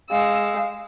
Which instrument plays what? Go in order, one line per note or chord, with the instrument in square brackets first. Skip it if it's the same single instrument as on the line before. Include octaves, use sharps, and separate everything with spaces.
[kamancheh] G#3 E6 [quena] F5